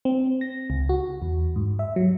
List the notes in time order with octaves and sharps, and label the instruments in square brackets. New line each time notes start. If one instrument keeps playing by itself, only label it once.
[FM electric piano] C4
A#6
C#2
F#4
E2
G#2
E5
F#3